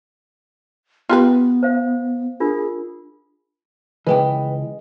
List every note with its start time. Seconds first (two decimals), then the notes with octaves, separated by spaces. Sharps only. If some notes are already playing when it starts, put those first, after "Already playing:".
1.09 B3 F4 G4 B4
1.63 C5 F5
2.40 D4 F4 G#4 A#4
4.07 C#2 F#2 E3 G#4 B4 D#5 G5